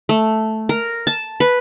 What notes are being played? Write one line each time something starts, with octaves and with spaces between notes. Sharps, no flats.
A3
A#4
A5
B4